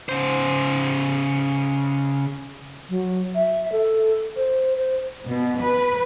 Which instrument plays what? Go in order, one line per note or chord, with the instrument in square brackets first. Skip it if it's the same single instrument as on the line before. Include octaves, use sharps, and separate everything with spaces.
[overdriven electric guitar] C#3 C5
[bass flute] F#3
E5
A4
C5
C5
[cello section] B2
B4